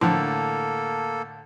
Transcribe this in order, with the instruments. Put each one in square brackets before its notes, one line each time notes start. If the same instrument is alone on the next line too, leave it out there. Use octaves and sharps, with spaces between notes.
[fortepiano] A2 D3 [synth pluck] E3 F3 [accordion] A#3 A4